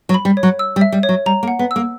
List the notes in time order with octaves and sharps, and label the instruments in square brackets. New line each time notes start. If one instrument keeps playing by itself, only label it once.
[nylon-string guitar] F#3
[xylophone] B5
[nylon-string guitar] G3
[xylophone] C#5
[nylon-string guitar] F#3
[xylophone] E6
[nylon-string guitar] G3
[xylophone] E5
[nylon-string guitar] G3
[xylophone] C#5
[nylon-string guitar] F#3
[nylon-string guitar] G3 [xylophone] A#5
[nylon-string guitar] A#3
[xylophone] F#5
[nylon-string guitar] B3
[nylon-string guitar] A#3 [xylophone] E6